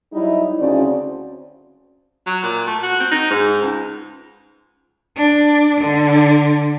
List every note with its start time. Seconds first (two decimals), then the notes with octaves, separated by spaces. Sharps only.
0.13 F#3 G3 D#4 E4
0.59 D2 C#3 C4 C#4 F#4 D5
2.27 F#3
2.43 A#2
2.67 A3
2.83 F#4
3.00 C4
3.11 D#4
3.30 G#2
3.62 C#2
5.16 D4
5.81 D3